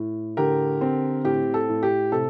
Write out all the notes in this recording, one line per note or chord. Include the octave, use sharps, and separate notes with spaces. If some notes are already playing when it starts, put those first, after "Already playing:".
Already playing: A2
D3 G4 A#4
C4
A2 G4
A4
A2
G4
C3 A4